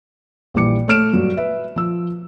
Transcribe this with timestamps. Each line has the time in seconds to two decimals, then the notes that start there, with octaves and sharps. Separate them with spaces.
0.54 A#1 E3 G3 D6 C#7
0.88 A3 C#5 F6 D7 E7
1.13 G2 F#3
1.37 B4 E5
1.76 F3 E6